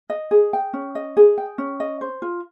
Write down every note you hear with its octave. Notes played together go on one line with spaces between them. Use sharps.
D#5
G#4
G5
C#4
D#5
G#4
G5
C#4
D#5
C5
F4